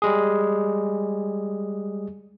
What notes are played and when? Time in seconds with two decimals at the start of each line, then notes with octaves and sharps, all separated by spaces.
0.02 G3 G#3 G#4